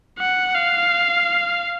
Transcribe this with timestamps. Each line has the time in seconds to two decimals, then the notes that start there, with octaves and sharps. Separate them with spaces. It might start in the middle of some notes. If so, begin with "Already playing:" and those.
0.19 F#5
0.55 F5